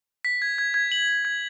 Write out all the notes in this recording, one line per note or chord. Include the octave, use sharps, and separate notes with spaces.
B6
G#6
G#6
G#6
F#7
F#7
G#6